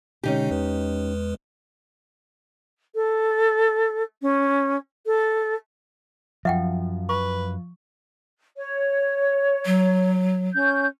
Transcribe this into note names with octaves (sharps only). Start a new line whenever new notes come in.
B2 D3 G#3 C#4 D#4 G4
E2 G#3 B4
A4
C#4
A4
F#2 F3 F#3 E5 F#5 G5
B4 C#6
C#5
F#3
C#4 G6